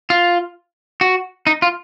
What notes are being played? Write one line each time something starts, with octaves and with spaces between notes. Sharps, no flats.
F4
F#4
D#4
F4